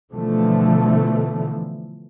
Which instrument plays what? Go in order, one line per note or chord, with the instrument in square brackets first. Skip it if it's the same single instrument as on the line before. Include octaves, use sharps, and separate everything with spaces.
[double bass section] B2 D3 E3 F3 A3